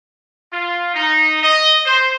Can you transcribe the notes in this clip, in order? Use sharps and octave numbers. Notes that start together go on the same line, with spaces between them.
F4
D#4
D#5
C5